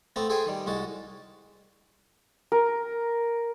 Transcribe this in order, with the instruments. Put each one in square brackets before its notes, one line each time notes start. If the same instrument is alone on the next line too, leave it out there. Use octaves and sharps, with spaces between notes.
[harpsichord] A3 B3 C4 A5 A#5
G#4 A4 C5 E5 G5 G#5
D#3 G3
C2 G#3 F#4 A5
[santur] A#4